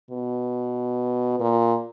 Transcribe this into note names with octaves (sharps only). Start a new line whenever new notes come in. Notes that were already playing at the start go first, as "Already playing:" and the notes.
B2
A#2